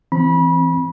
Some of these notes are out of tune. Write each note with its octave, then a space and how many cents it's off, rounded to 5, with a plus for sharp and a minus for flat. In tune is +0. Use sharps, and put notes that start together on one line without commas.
E3 +10 C4 +0 B5 -30